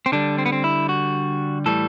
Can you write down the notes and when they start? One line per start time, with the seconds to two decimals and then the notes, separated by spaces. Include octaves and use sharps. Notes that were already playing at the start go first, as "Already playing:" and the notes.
0.06 C4
0.12 D3 G3 D4
0.38 C4
0.46 B3
0.52 C4
0.64 E4
0.89 F#4
1.66 A2 E3 G3 A4